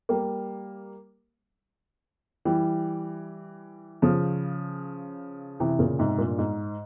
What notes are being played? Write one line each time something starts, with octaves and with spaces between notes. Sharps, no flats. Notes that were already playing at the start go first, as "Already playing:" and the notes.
G3 A#3
E3 G3
C#3 F3
C3 E3
A#2 C#3
G#2 C3
G2 A#2
G#2